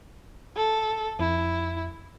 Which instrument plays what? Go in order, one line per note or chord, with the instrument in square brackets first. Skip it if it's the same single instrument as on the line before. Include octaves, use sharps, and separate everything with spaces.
[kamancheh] A4
[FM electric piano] F2 [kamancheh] E4